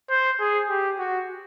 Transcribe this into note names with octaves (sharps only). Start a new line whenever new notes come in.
C5
G#4
G4
F#4